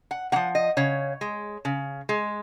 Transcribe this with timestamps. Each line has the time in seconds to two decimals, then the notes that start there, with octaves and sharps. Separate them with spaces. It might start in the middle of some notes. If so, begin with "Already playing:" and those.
0.11 F#5
0.32 A#3 F#5
0.36 F3
0.55 D#5
0.77 C#3 C#5
1.21 G#3
1.65 C#3
2.09 G#3